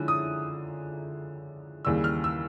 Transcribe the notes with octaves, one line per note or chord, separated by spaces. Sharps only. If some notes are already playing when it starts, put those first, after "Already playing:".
Already playing: D3 F3 G#3 C#4 E4
D#6
D#2 C#3 E3 G3 E6
F6
E6